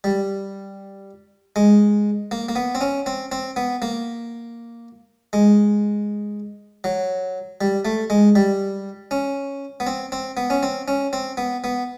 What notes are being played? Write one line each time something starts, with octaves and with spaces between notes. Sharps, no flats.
G3
G#3
A#3
A#3
B3
C4
C#4
C4
C4
B3
A#3
G#3
F#3
G3
A3
G#3
G3
C#4
B3
C4
C4
B3
C#4
C4
C#4
C4
B3
B3